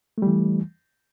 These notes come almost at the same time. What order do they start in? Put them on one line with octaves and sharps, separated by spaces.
A3 G3 E3